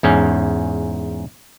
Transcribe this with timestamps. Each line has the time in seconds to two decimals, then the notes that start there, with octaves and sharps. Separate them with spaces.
0.03 E2 G#2 C#4